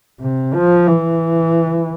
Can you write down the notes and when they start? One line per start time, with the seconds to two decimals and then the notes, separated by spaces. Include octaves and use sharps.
0.20 C3
0.54 F3
0.88 E3